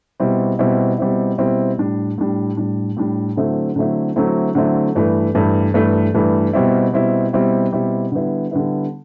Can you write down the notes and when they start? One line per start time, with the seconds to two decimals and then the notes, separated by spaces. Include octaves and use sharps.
0.20 B2 G3 C4 E4
0.59 B2 G3 C4 E4
0.98 B2 G3 C4 E4
1.38 B2 G3 C4 E4
1.77 A2 G3 D4
2.18 A2 G3 D4
2.57 A2 G3 D4
2.97 A2 G3 D4
3.36 D3 F#3 A3 C4 E4
3.76 D3 F#3 A3 C4 E4
4.16 D3 F#3 A3 C4 E4
4.55 D3 F#3 A3 C4 E4
4.95 G2 E3 A3
5.35 G2 E3 A3
5.74 G2 E3 A3
6.14 G2 E3 A3
6.53 B2 G3 C4 E4
6.93 B2 G3 C4 E4
7.33 B2 G3 C4 E4
7.72 B2 G3 C4 E4
8.12 D3 G3 B3 E4
8.51 D3 G3 B3 E4